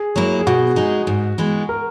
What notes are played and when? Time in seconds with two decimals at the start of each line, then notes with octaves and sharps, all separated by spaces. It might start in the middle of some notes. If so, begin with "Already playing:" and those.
Already playing: G#4
0.16 F#3 A#3 E4
0.39 G#4
0.47 B2 F#4
0.76 G#3 D#4 G#4
1.07 G#2
1.38 E3 G#3 B3
1.69 A#4